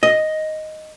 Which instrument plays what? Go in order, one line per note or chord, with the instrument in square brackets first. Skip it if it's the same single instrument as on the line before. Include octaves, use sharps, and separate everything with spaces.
[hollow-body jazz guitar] D#5